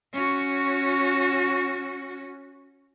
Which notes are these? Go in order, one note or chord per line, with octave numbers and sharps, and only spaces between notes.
C#4 F#4